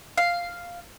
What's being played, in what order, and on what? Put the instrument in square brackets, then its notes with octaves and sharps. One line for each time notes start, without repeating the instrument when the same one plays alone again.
[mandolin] F5